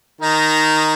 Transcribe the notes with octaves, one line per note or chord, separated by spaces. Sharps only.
D#3 D#4